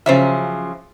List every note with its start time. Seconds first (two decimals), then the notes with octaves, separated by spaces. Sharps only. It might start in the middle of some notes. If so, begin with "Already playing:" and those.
0.06 C#3 F3 F#3 C5 C#5 E5